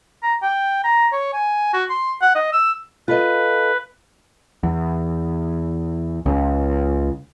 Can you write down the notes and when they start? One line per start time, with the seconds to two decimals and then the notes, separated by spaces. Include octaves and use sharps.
0.23 A#5
0.42 G5
0.84 A#5
1.12 C#5
1.33 G#5
1.73 F#4
1.90 C6
2.21 F#5
2.35 D#5
2.53 E6
3.08 F4 A4 B4 D#5
4.63 E2
6.26 C#2